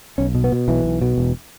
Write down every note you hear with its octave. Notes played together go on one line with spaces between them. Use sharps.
B1 C#4
B2
B3
B2
B1 E3
B1
B2
E1